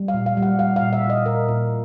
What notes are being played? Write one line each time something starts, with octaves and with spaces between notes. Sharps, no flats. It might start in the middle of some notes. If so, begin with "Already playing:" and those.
Already playing: G3
F5
A#2
F5
G3
F#5
G3 F5
F5
A#2
E5
A#2
D#5
A#2 A#4
A#2